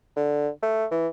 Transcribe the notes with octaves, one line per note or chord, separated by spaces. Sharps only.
D3
A3
E3